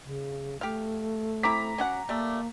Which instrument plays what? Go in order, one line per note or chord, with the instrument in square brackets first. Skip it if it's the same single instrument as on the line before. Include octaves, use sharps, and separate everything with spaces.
[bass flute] C#3
[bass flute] A3 [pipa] G4 F5
[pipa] C4 E4 [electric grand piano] A#5 D6 B6
[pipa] C#4 F#4 F#5
[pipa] G3 A3 [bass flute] A#3